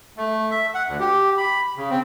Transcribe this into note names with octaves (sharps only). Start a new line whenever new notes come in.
A3
E5
F#5
D2
G4
B5
C#3
C4